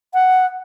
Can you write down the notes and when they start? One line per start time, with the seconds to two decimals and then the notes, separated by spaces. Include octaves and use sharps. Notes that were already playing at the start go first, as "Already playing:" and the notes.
0.14 F#5